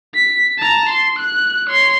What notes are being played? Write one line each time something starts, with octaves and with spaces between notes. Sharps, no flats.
B6
A5 A#5
C6
F#6
C#5 C6